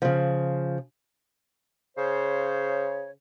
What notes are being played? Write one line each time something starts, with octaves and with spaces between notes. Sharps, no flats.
C#3 F3
C#3 C5 C#5